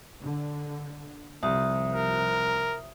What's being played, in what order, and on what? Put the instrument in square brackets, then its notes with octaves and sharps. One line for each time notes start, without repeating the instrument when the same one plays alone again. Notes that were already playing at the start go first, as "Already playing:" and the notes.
[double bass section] D3
[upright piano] C2 [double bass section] C3 F3 [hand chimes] E5 D#6
[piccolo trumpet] A#4